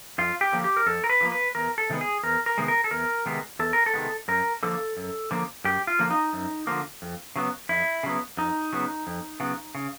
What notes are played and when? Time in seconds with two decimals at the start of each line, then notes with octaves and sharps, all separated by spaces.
0.18 F2 F4
0.41 G4
0.52 D3 F3 A#3
0.64 G4
0.76 A#4
0.86 F2 A4
1.04 A#4
1.10 B4
1.21 D3 F3 A#3
1.32 B4
1.55 E2 A#4
1.78 A4
1.90 C3 D#3 G#3 B3
2.01 G#4
2.23 E2 A#4
2.46 A#4
2.58 C3 D#3 G#3 B3
2.68 A#4
2.84 A4
2.91 E2 A#4
3.26 C3 D#3 G#3 B3
3.59 E2 A4
3.73 A#4
3.86 A4
3.94 C3 D#3 G#3 B3
4.28 F#2 A#4
4.63 D3 F3 A#3 A4
4.97 F#2
5.31 D3 F3 A#3
5.64 F#2 G4
5.87 F4
5.99 D3 F3 A#3
6.11 D#4
6.33 F#2
6.67 D3 F3 A#3
7.02 F2
7.36 C#3 F#3 B3
7.69 F2 E4
8.03 C#3 F#3 B3
8.37 F2 D#4
8.73 C#3 F#3 B3
9.07 F2
9.40 C#3 F#3 B3
9.75 C#3